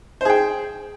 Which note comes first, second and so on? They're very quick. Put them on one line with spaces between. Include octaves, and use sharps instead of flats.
C5 G#4 G5